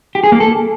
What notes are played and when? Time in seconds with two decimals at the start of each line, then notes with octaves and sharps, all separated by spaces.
0.15 G4
0.24 G#4
0.32 A#3
0.40 A4